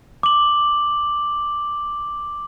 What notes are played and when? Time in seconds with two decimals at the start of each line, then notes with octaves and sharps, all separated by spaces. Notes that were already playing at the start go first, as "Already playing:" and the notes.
0.23 D6 F#7